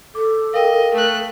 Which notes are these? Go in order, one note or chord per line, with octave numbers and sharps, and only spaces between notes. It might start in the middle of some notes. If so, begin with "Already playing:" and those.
A4 D6
A#4 D#5 F5 G5
A3 F#6